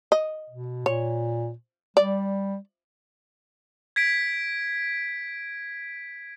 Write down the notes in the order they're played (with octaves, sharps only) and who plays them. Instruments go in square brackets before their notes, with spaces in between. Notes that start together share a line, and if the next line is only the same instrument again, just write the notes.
[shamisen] D#5
[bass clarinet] B2
[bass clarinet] A#2 [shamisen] C#5
[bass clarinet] G3 [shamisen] D5
[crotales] G#6 B6 D7